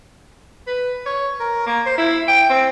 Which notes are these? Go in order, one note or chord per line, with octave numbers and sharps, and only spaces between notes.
B4
C#5
A#4
A#3
C5
E4
G5
C4